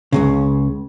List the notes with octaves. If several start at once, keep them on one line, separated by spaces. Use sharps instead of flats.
C#2 G#2 C#3